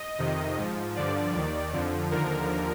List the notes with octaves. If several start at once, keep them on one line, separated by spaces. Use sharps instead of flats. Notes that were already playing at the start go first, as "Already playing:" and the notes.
Already playing: D#5
F2 C3 D#3
G#2 F3
G2 D3 F3 D5
D#2 D#3
F2 D3 F3
D#2 D3 F3 A#4